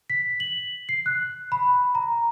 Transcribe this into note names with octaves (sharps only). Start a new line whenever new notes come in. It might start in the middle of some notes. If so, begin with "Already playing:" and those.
B6
F#7
C7
F#6
B5
A#5